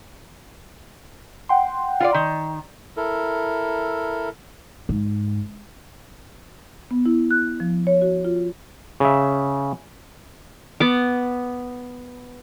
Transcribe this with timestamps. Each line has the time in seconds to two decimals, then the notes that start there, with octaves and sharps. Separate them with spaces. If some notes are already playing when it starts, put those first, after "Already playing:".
1.49 F#5 G5 C6
2.00 F4 C5 D5
2.14 D#3
2.97 E4 A4 A#4
4.89 G#2
6.91 B3
7.06 E4
7.31 F#6
7.60 F3
7.87 C#5
8.02 F#4
8.25 F4
9.00 C#3 E5
10.80 B3 D6